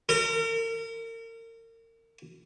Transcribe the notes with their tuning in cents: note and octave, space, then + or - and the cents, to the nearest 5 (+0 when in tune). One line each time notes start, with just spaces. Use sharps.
A#4 -35